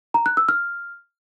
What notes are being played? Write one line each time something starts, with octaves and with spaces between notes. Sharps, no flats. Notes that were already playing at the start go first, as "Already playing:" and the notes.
A#5
F#6
E6
F6